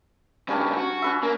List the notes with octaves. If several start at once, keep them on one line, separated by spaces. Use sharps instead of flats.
G2 C#3 G3 C#4 D4
F#4
C#4 B4 E5
A#3